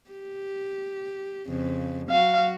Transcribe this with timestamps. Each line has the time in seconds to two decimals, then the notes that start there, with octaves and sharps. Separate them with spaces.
0.10 G4
1.48 F2 C#3
2.10 F#3 F#4 F5